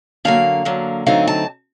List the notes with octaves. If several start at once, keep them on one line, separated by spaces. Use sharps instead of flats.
D3 F#3 A#3 F5
D3 F#3 A#3
D3 F#3 A3 C4 D#4 F5
A5